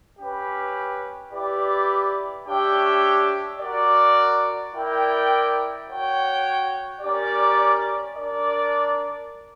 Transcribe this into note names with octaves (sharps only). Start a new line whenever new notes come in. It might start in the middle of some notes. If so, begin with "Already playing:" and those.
C#4 G4 B4
E4 G4 B4 D5
D4 G4 C#5 E5 G5
F#4 A#4 D5
E4 A#4 D5 G5
F#4 C#5 G5
C#4 G4 A#4 D5
D4 A#4 D5